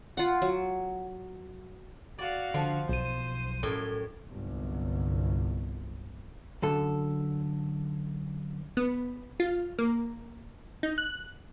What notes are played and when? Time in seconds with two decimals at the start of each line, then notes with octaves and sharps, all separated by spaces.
0.17 F4 F#5
0.42 F#3
2.18 F#4 D5 F5
2.54 D3 F3
2.89 B1 C5 D#7
3.63 F#2 A2 G5
4.28 G1 C2 F#2
6.62 F#2 D3 A4
8.77 B3
9.40 F4
9.79 A#3
10.83 D#4
10.98 F#6